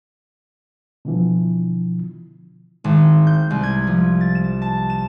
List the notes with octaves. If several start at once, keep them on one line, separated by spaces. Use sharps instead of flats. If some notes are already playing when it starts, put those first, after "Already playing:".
B2 D3 E3 F3
G#1
G6
C2
G#6
F3
A6
E7
A5
E7